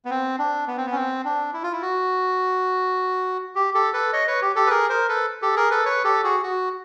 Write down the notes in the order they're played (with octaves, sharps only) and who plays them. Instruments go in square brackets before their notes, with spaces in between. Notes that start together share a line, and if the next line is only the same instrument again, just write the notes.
[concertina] B3
C4
D4
B3
C4
B3
C#4
C4
D4
E4
F4
E4
F#4
G4
G4 A4
A4 B4
C#5 D#5
B4 C#5
G4
G4 A4
B4
G#4 A#4
A#4 C5
A4 B4
G4 A4
G#4 A#4
A4 B4
B4 C#5
G4 A4
F#4 G#4
F#4